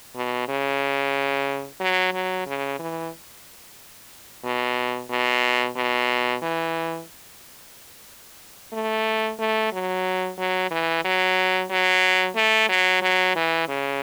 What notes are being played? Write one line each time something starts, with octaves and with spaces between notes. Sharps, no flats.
B2
C#3
F#3
F#3
C#3
E3
B2
B2
B2
E3
A3
A3
F#3
F#3
E3
F#3
F#3
A3
F#3
F#3
E3
C#3